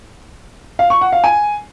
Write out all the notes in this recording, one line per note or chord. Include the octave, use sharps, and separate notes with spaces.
F5
C#6
F#5
F5
G#5